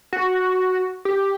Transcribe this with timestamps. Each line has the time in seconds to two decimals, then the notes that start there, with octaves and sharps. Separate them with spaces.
0.13 F#4
1.05 G4